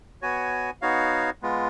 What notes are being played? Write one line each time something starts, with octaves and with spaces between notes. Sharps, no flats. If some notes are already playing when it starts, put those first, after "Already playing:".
B3 F#4 C#5 G#5
B3 D#4 F#4 C#5 F5
G#3 B3 F4